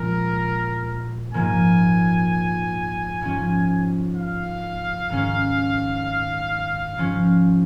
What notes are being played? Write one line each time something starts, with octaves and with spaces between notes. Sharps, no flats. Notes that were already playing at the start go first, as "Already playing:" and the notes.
Already playing: A#2 F3 G#3 A#4
G#2 F3 A#3 G#5
G#2 F3 C#4
F5
G#2 D#3 C#4
G#2 F3 C#4